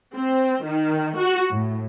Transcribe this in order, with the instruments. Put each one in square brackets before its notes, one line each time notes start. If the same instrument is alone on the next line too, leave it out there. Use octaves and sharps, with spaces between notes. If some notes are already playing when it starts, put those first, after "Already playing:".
[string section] C4
D#3
F#4
A2